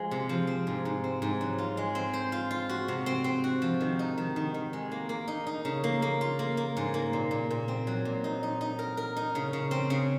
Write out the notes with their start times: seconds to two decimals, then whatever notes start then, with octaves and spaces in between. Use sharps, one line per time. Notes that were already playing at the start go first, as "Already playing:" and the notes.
Already playing: F3 G#3
0.11 C3
0.29 F3
0.47 C4
0.67 G#2
0.85 G#2
1.04 C4
1.22 G#2
1.41 F#3
1.58 F4
1.77 G#3
1.95 C4
2.13 C5
2.32 F4
2.51 F4
2.69 F#4
2.88 C3
3.06 C4
3.24 C4
3.44 F#4
3.62 F3
3.80 D#3
3.99 D#4
4.18 D#3
4.36 D#3
4.54 D#3
4.73 G#3
4.92 A#3
5.09 A#3
5.28 D#4
5.47 D#4
5.65 C#3
5.84 A#3
6.02 A#3
6.21 F4
6.39 A#3
6.57 A#3
6.77 G#2
6.94 A#3
7.13 A#2
7.31 A#2
7.50 A#2
7.68 C4
7.87 F#3
8.05 A#2
8.24 D#4
8.43 D#4
8.61 D#4
8.79 A#4
8.97 A#4
9.16 D#4
9.35 C#3
9.53 C#3
9.71 C4
9.90 C#3